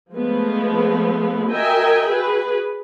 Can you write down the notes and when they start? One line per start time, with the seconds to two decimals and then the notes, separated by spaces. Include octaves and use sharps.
0.13 F3 G#3 A3 B3
1.51 F#4 A#4 D#5 E5 G5 G#5
2.09 F#4 G#4 B4